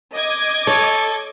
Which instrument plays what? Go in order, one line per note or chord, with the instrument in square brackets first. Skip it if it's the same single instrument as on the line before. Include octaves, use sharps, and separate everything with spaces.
[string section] D#5 D6 G#6
[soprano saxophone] A4 [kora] C#5